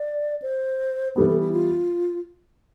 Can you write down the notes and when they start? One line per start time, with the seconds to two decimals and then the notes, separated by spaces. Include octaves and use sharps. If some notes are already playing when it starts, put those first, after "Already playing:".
Already playing: D5
0.42 C5
1.16 E3 G3 B3 A4
1.29 A4
1.40 E4
1.53 F4